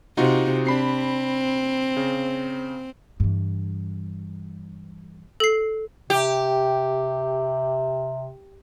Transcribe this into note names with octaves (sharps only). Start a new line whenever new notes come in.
C3 D#4 F4 F#4
C4 D4 B5 C7
C#3
G2 E3
A4 C7
C3 G4